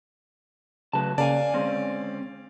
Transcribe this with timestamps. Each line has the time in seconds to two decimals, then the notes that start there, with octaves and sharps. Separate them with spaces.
0.93 C#2 C#3 F#3 A3 B4 A5
1.18 C#3 A#3 D5 F5 G#5 A5
1.54 D3 G#3 C4 C#4